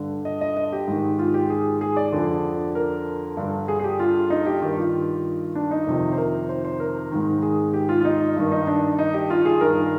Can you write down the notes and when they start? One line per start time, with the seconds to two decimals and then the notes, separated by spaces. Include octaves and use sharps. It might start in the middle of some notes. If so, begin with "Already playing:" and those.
Already playing: G2 D3
0.25 D#5
0.41 D#5
0.57 D#5
0.72 G4
0.88 G#2 D#3
1.19 F4
1.34 G4
1.50 G#4
1.81 G#4
1.97 D5
2.13 F2 D3
2.75 A#4
3.37 G2 D3
3.68 G#4
3.80 G#4
3.84 G4
3.99 F4
4.30 D#4
4.46 G4
4.62 G2 D#3 G4
4.78 F4
5.55 D4
5.71 D#4
5.87 F2 C3 D#3
6.12 C5
6.18 A#4
6.49 C5
6.65 C5
6.80 A#4
7.11 G#2 D#3
7.42 G#4
7.74 G4
7.89 F4
8.01 F4
8.05 D#4
8.36 G2 D#3
8.52 D#4
8.67 D4
8.99 D#4
9.14 G4
9.30 F4
9.45 G#4
9.61 G2 D#3 A#4